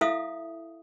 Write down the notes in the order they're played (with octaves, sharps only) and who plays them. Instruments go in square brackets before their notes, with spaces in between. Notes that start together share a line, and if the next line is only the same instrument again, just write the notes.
[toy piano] E4 A4 E5 F5 D#6